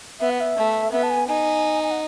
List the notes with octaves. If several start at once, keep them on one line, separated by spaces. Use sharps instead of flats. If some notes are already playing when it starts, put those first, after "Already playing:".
B3 E5
F#5
E5
A3
B3 E5
A5
G#5
D#4 G#5
G#5
F#5